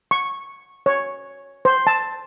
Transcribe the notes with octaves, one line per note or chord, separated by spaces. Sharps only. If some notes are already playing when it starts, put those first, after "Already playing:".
C#6
C#5
C5
A5